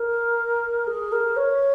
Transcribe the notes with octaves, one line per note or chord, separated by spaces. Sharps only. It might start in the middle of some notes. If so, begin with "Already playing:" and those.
Already playing: A#4
G#4
A#4
C#5